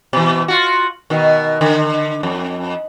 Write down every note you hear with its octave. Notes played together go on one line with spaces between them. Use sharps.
B2 E3
F4 F#4
B2 D#3
D3
F2